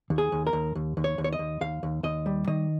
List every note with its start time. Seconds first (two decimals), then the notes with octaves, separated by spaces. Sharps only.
0.10 D#2
0.18 G#4
0.32 D#2
0.47 A#4
0.53 D#2
0.75 D#2
0.97 D#2
1.04 C#5
1.18 D#2
1.24 C#5
1.33 D#5
1.39 D#2
1.61 D#2 F5
1.83 D#2
2.03 D#2 D#5
2.26 G3
2.48 D#3 D#5